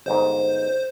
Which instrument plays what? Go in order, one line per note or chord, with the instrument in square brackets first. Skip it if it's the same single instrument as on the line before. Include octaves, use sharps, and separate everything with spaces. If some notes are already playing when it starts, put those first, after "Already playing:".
[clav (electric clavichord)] G1 G#2 [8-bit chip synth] C5